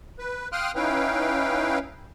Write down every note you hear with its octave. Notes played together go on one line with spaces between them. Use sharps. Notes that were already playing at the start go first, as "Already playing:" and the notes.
B4
F5 G5 C6 D#6 F6 F#6
C#4 D#4 E4 B4 F5 G5